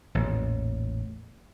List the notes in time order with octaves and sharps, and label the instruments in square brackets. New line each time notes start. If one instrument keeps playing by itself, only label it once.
[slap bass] A1 E2 A#2